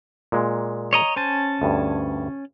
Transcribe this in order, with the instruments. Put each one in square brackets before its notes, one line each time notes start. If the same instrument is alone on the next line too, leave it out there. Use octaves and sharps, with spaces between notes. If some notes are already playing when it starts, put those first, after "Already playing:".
[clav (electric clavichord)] A#2 G#3
[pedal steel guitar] C#5 D#5 A#5
[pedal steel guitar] C#4 G#5 A5 [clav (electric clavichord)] C5
[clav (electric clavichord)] D2 G2